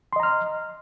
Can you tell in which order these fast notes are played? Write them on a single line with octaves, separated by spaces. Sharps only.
C6 D#5 A#5 F6